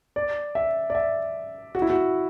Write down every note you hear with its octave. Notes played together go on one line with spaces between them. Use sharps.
D5
E5
D5
E5
F#4
E4
F#4